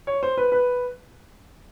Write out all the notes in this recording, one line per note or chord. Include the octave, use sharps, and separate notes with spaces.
C#5
C5
B4
B4